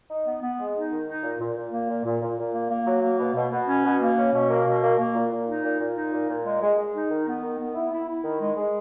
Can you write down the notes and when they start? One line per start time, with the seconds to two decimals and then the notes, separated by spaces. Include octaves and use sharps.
0.09 D#4
0.26 B3
0.42 B3
0.58 G#3
0.74 D#4
0.91 D#3
1.07 D#4
1.23 A#2
1.40 A#2
1.56 A#2
1.72 A#3
1.88 A#2
2.04 A#2
2.21 A#2
2.38 A#2
2.53 A#3
2.70 A#3
2.86 F#3
3.02 A#3
3.19 B2
3.35 B2
3.51 B2
3.67 C#4
3.84 B2
4.00 A#3
4.17 C#4
4.33 B2
4.49 A#3
4.66 B2
4.82 A#3
4.98 A#3
5.14 A#2
5.30 A#2
5.47 D#4
5.63 A#2
5.79 A#2
5.96 D#4
6.12 A#2
6.28 A#2
6.45 G#3
6.61 G#3
6.77 G#3
6.94 D#4
7.10 D#3
7.26 B3
7.42 D#3
7.59 B3
7.75 E4
7.91 E4
8.08 E4
8.24 D#3
8.40 G#3
8.56 G#3